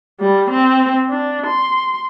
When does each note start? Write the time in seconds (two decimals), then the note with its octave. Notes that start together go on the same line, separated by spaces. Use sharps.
0.20 G3
0.50 C4
1.09 D4
1.47 C6